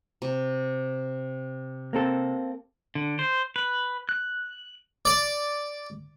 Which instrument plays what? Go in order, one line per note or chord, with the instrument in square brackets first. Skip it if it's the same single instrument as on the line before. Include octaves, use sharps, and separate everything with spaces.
[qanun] C3
[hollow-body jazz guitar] A#3 C4 A4
[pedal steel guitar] D3
C5
B4
F#6
[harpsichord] D5